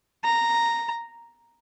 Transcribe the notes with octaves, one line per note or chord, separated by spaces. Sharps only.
A#5